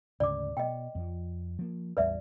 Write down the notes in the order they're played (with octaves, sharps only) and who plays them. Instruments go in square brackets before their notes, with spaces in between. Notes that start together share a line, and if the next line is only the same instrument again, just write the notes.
[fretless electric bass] D2 G#2 C#3 [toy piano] D5 D6
[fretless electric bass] B2 [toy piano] D#5 G5
[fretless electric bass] F2 F3
F3 A#3
[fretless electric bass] A1 E2 G3 [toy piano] B4 D5 E5